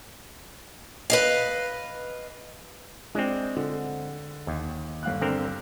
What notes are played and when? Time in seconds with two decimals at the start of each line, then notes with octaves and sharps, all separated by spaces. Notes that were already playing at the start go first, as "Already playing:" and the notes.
1.10 B4 D#5 F5
3.15 G#3 C4 D4
3.56 D3
4.47 D#2
5.03 G1 F5 F#6
5.21 D3 C4 A#4